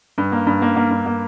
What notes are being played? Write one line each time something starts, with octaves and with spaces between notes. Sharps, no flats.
G2
A#3
G2
A#3
A#3
G2
A#3